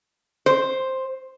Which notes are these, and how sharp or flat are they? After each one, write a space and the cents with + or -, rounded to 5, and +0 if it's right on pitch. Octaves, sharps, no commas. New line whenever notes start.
C5 +5